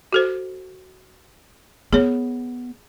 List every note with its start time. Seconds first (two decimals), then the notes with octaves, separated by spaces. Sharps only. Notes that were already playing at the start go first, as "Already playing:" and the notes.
0.13 F#4 A4 C5
1.93 B3 G#4 C#5